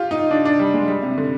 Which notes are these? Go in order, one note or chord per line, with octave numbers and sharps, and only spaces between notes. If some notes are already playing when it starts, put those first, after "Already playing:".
Already playing: F4 G4
D#4
D4
D4
G3
G#3
G3
C3
D3